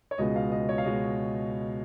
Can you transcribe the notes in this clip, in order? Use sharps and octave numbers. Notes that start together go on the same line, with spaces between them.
C#5
C#2 B2 G#3 D#5
F5
D#5
C#5
F5
B2 G#3 D#5